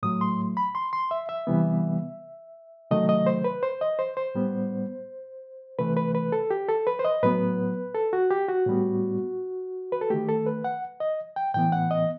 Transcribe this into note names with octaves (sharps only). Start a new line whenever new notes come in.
A2 F#3 A3 D#6
C6
B5
C6
C6
E5
E5
C3 E3 G3 B3
C3 D#3 F#3 A3 D#5
D#5
C5
B4
C5
D#5
C5
C5
A2 G3 B3
C3 E3 A3 B4
B4
B4
A4
G4
A4
B4
C5
D#5
A2 F#3 B3 B4
A4
F#4
G4
F#4
A2 G3 B3
B4
A4
D#3 A3 G4
A4
B4
F#5
D#5
G5
A2 E3 B3 G5
F#5
D#5